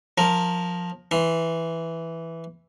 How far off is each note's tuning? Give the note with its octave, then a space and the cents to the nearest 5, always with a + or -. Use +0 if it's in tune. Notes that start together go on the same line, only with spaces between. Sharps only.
F3 +20 A#4 +0
E3 +0 C6 +0